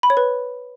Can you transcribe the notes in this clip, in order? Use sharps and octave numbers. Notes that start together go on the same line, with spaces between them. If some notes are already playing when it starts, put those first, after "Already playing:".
B5
C#5
B4